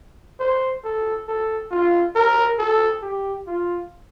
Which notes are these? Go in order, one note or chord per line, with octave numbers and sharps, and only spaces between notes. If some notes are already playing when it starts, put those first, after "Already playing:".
C5
A4
A4
F4
A#4
A4
G4
F4